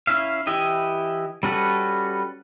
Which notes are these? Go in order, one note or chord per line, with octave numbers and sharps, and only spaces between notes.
C#4 E4 E5 F5
E3 E4 G4 D#5
G3 C#4 F#4 A4 B4